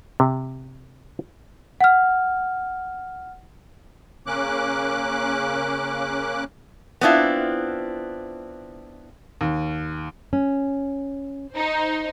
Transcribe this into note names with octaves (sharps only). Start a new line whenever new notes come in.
C3
F#5 F6
C#3 A#3 C#4 D6 F#6
B3 C4 D4 E4 F4
D#2
C#4
D#4 C5